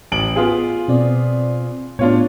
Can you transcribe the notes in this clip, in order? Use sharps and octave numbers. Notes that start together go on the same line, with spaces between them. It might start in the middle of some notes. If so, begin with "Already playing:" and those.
A1 D7 F#7
B3 F4 G#4
B2 C4 D5
A2 B3 D4 F4 C#5